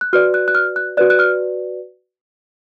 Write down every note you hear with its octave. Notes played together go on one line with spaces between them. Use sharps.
F#6
F#4 B4 D5 F6
F#6
F#6
F6
F#6
F#4 B4 D5 F#6
F#6
F6